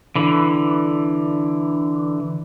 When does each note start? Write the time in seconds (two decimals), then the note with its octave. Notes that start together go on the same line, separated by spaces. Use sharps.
0.16 D3 E3